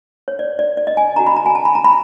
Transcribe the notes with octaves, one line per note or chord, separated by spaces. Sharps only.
C#5
D5
D5
D5
D#5
G#5
C#4 F#4 A4 A#5
B5
A#5
G#5
A5
B5
A#5
B5